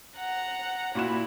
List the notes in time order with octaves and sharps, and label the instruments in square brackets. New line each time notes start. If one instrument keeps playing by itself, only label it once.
[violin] F#5 A#5
[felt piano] A#2 F#4 E7 [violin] E4